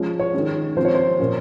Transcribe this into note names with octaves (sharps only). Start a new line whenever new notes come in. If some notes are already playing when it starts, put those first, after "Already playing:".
Already playing: F3 G#3 C#4
C#5
D#3 G#3 C#4
F3 C4 C5
C#5
C5
A#2 F3 A#3 C#4